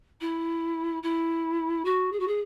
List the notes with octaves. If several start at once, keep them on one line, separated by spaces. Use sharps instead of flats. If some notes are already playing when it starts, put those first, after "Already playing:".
E4
E4
F#4
G#4
F#4
G#4